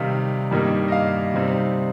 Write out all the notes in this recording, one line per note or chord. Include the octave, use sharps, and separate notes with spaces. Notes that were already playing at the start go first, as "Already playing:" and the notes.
Already playing: C3 D#3 G3 D#4 F5
G2 D#3 G3 A#3 D#4
D#5
F5
C3 G3 C4 D#4